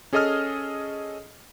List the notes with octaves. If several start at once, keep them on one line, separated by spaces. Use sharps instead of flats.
C#4 G#4 A4 D#5 D#6 F6